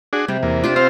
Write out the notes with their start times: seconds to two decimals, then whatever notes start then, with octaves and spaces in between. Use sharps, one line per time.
0.13 D4 F#4 G#4
0.28 C3 G3
0.43 E2 A#3
0.64 D4 F4 G4 C5
0.76 C4 C5 F5 A#5